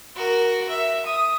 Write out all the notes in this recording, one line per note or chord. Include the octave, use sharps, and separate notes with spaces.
F#4 A#4
E5
D#6